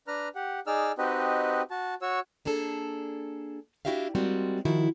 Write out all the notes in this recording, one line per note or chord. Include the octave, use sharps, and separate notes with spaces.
D4 B4 A#5 F6
G4 F#5
D#4 G#4 D5 E6 F6
C4 D#4 F#4 G4 B4 D#5
F#4 A5
F#4 C#5 E6
A#3 D4 G#4 A4
D4 E4 F#4 G4 E5 F5
G3 G#3 A#3 C4 F#4
D#3 F3 E4 F#4